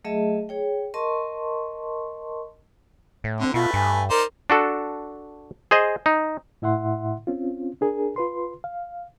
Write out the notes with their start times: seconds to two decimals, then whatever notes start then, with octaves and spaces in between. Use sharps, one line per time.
0.04 F#3 A3 G#4 D#5 E5 A5
0.49 G#4 C#5 G5
0.94 A#4 D#5 A5 C6 C#6
3.24 A2
3.40 D3 C4
3.54 B2 A3 F4 B4
3.73 G2 G#5
4.10 D#4 A#4 C5 D5
4.50 D4 F#4 A4
5.71 G#4 C5 D#5
6.06 D#4
6.62 A2 E4 E5 F#5 C6
7.27 C4 C#4 F4
7.81 D4 G#4 A#4
8.16 F4 B4 C6
8.64 F5